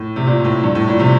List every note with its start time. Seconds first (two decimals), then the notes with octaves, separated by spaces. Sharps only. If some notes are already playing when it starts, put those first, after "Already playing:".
Already playing: A2
0.16 C3
0.27 A#2
0.44 A2
0.63 G2
0.75 A2
0.88 A#2
0.99 C3